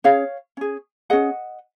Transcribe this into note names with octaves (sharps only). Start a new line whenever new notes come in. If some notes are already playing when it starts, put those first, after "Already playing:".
C#4 G#4 C#5 F5
C#4 G#4
C#4 G#4 D#5 F#5